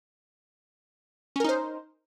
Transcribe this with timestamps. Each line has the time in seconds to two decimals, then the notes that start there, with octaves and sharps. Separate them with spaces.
1.36 C#4
1.40 A#4
1.44 D#4
1.49 C5